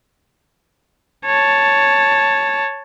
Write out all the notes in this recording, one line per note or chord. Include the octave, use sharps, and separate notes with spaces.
C#5 A5